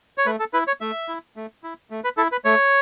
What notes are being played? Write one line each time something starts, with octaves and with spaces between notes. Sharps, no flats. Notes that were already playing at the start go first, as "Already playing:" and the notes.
C#5
A3 B4
A4
E4 B4
C#5
A3 E5
E4
A3
E4
A3
B4
E4 A4
B4
A3 C#5